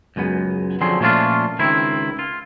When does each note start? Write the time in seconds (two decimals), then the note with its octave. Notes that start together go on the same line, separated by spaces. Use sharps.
0.16 C#2 F#2 G#3 B3
0.81 D3 F3 F#3 C4 G#4 C6
1.00 A#2 F3 A3 C#4 D4 F4
1.59 C#2 D#3 C4 E4
2.19 F4